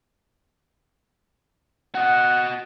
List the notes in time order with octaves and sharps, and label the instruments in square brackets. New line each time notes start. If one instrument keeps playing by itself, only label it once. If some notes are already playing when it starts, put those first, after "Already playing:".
[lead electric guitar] F#4 D#5 [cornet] F#5